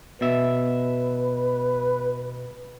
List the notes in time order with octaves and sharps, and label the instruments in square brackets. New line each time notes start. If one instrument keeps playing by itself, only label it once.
[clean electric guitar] B2 E5 [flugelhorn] B4